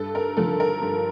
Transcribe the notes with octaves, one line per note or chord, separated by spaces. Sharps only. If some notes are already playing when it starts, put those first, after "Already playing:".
Already playing: G2 A4
A#4
D3 F3 A4
A#4
G2